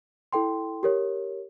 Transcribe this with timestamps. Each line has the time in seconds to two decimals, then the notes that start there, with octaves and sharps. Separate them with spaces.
0.33 E4 A4 G5 C6
0.83 G4 A#4 C#5